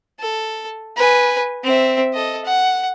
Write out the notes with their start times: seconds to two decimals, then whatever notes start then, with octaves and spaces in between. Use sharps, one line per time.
0.20 A4
0.97 B4 G#5
1.64 C4 E5
2.13 A4 D#5
2.45 F#5